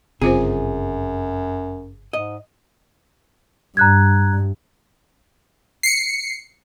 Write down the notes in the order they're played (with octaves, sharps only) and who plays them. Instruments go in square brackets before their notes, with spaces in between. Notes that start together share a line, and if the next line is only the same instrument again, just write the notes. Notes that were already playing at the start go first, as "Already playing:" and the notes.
[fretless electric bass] G1 C#3 [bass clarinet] F#2 [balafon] C4 F4 C5 [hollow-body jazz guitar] G#4
[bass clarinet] G#2 [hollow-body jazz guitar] D#5
[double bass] G2 [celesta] A#5 F#6 G#6
[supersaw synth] C7 C#7